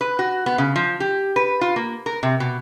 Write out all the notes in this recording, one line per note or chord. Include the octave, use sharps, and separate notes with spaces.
B4
F#4
B3
C#3
F3
G4
B4
F4
A#3
A#4
C3
B2